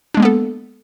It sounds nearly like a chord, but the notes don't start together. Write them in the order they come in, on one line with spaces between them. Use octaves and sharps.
D4 G#3 A#3 B3 A4